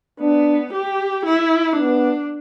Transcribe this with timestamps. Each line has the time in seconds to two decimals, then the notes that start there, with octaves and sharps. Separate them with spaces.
0.20 B3 D4
0.73 G4
1.25 E4
1.76 B3 D4